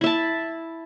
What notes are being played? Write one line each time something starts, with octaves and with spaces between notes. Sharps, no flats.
E4 E5 A5